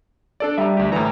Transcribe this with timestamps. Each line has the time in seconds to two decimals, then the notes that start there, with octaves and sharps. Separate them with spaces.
0.40 D4 A4 D5
0.58 G3 E5 A#5
0.77 D2 G4
0.92 D2 A2 E3 A#5